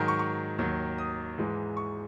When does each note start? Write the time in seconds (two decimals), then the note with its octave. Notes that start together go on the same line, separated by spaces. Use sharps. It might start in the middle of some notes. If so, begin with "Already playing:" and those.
Already playing: G#2 D#3 F#3 G#5 A#5
0.08 C#6
0.19 C#6
0.58 D#2 D#3 F#3
0.98 D#6
1.38 G#2 E3 G#3
1.77 C#6